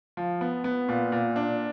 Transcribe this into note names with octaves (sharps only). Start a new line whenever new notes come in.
F3
B3
B3
A#2
A#2
D4